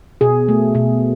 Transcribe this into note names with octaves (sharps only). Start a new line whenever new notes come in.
B2 G#4
A3
B2